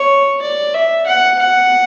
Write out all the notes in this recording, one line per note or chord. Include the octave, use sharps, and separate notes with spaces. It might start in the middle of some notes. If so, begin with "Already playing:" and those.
Already playing: C#5
D5
E5
F#5
F#5